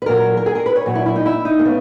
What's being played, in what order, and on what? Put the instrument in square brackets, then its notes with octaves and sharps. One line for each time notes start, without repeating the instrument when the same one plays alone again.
[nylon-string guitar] B4
A#2 F#3 A#4
A#4
G#4
A#4
B4
C#5
A#2 F#3
E4
E4
D#4
E4
D#4
A#3
C#3 B3